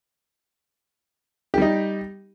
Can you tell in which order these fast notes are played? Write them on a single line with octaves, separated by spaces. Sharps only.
G4 G3 D#4